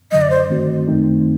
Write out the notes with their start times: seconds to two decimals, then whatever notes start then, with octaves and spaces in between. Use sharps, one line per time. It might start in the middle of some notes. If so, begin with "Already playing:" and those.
0.12 F#2 D3 F#3 D#5
0.22 D5
0.30 C5
0.50 G2 D#3 A3 C4 F#4
0.88 F#2 D#3 A3 C4 D#4